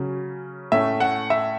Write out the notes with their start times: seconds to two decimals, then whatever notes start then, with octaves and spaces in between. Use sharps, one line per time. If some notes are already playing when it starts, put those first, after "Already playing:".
Already playing: C#3 F#3 C#4
0.72 A2 A3 C#4 E5
1.00 F#5
1.30 E5